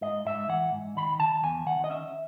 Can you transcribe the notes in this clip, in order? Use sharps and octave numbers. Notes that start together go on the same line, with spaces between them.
G#2 D#5
G#2 E5
E3 F#5
G#2
D#3 B5
D#3 A5
E2 G#5
D#3 F#5
D#5
C#4 E5